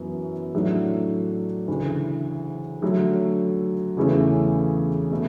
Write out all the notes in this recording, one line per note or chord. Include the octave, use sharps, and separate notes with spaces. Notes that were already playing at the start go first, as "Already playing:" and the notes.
Already playing: F#2 E3 B3 F#4
A2 F#3 A3 D4 A4
D2 C#3 E3
D3 F#3 A3
E2 C#3 E3 A3 C#4
B2 A3